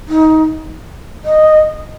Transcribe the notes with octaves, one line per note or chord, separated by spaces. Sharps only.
D#4
D#5